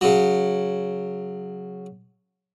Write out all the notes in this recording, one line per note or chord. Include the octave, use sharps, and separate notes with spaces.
C#3 F#3